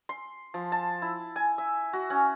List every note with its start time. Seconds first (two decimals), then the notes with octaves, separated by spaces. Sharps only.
0.09 C6
0.54 F3
0.72 A5
1.02 E4
1.36 G#5
1.58 E5
1.93 F#4
2.10 C#4